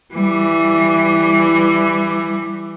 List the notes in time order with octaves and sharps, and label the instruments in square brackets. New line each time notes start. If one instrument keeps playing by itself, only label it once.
[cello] E3 G3